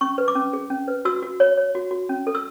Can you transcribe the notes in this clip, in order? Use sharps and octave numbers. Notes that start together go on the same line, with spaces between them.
C#4 C#6
B4
D6
C#4
G#4
C#4
B4
F#4 E6
F#4
C#5
C#5
F#4
F#4
C#4
A4
E6